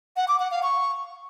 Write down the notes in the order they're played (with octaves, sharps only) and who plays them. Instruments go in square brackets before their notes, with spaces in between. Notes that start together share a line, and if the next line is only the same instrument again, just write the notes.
[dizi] F#5
D6
F#5
F5
C#6